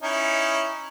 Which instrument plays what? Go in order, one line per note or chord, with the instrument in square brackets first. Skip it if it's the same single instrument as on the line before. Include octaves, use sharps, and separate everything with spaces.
[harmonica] C#4 D#4 E4